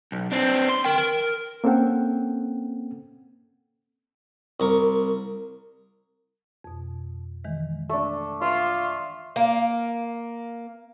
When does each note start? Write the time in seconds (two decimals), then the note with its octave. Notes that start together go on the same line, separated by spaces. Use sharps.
0.12 B1
0.32 C4 D4
0.69 C6
0.85 A#4 G5
0.98 A#4
1.64 A#3 C4 C#4 A4 F#5 G5
4.60 C2 A#4 C#6
6.64 F2 B2
7.44 D#3 E3 G#3
7.90 A3 D4 C#6
8.42 F4 E5 C6 D6
9.36 A#3